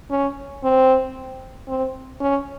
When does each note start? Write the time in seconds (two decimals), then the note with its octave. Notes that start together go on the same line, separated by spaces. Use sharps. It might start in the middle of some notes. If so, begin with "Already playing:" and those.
0.11 C#4
0.63 C4
1.68 C4
2.20 C#4